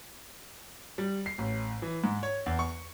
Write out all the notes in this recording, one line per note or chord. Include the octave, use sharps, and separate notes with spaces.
G3
C7
A1
E3
G#2
C#5
E2
C#6